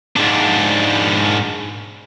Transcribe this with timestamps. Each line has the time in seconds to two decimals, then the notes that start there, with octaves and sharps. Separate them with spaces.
0.16 G#2 D4